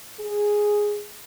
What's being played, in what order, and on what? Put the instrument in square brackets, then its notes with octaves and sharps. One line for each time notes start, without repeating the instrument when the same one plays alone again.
[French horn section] G#4